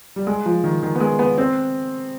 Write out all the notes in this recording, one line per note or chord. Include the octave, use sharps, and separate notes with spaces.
G3
G#3
F3
D#3
D#3
B3
G#3
B3
C4